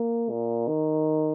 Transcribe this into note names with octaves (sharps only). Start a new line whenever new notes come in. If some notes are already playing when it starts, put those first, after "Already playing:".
Already playing: A#3
A#2
D#3